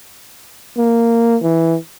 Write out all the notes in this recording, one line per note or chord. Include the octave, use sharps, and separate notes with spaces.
A#3
E3